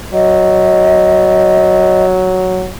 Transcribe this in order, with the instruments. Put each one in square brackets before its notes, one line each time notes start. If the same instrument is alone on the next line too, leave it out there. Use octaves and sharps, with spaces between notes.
[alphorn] F#3 [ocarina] D#5